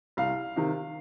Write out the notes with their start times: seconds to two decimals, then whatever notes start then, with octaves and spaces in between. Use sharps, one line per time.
0.17 C2 F5
0.56 C3 D#3